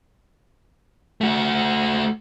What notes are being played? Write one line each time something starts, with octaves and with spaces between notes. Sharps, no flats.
A3 F#4